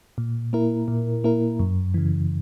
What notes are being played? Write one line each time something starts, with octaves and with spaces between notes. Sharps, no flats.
A#2
A#3 E4 A#4
A#2
A#3 E4 A#4
F#2
C#3 E3